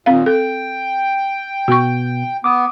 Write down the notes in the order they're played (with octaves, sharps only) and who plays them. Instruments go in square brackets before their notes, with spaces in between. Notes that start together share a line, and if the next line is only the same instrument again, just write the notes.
[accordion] D#2 A#2 [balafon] C4 F5
[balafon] A4 [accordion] G5
[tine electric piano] B2 B3 G6 [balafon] F#4 C#6
[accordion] B3 [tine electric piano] D6 D#6